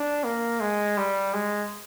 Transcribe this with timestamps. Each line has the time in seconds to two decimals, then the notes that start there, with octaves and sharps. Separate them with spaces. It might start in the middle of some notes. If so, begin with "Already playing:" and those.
Already playing: D4
0.24 A#3
0.60 G#3
0.97 G3
1.34 G#3